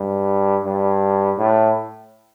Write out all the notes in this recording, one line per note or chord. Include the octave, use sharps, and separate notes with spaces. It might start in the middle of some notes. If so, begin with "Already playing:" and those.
Already playing: G2
G2
A2